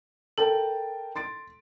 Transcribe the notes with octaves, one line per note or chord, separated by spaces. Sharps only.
A4 A#4 G5 A5
C6 A6 D7